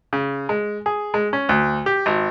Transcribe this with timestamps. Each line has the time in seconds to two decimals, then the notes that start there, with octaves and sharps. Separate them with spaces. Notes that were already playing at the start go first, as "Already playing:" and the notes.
0.13 C#3
0.49 G#3
0.86 G#4
1.14 G#3
1.33 C#4
1.49 D2
1.86 G4
2.06 G#1